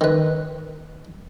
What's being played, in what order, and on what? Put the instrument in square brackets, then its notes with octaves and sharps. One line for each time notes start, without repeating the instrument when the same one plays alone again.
[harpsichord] D#3 B4